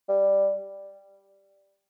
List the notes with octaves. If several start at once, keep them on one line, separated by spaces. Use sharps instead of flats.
G3